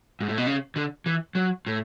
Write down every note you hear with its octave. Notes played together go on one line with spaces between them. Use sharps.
G#2
A2
B2
C#3
D3
E3
F#3
A2